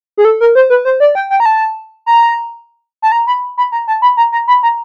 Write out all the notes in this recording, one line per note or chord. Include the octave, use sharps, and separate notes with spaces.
G#4
A4
A#4
C5
B4
C5
D5
G5
G5
A#5
A5
A#5
A5
A#5
B5
B5
A#5
A5
B5
A#5
A#5
B5
A#5